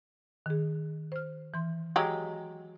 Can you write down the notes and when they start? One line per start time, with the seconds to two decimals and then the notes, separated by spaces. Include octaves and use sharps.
0.46 D#3 G#4
1.12 C5 F6
1.54 E3 C6
1.96 F#3 G#3 G4